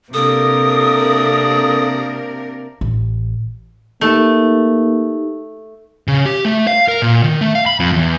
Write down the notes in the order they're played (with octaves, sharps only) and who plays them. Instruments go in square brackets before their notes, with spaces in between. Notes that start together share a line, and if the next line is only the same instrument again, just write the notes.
[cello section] C3 A#4 [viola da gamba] A#3 D4 [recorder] A4 [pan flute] D#6
[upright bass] A1
[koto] A3 [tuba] A#3 [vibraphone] D#4 G4
[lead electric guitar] C#3
G4
A3
F5
A#4
A#2
D#3
A3
F5
B5
F2
E2